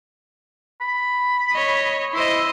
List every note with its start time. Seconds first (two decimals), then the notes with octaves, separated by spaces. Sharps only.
0.81 B5
1.53 C#5 D#5
2.14 E4 C5 D#5